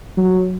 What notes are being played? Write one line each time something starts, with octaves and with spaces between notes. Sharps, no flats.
F#3